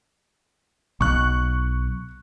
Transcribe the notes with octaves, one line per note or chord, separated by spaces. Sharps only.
B1 C#6 F#6